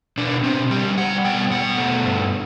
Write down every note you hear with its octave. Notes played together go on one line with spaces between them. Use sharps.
B2 D4
B2 C4
G3 G4
G3 F#5
B2 G5
B2 F#5
A3
G2